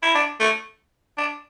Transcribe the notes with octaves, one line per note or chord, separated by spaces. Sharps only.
E4
D4
A3
D4